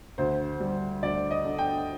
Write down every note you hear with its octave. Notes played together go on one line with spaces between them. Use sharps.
D2 C5
G3
D2 D5
D#5
D3
G5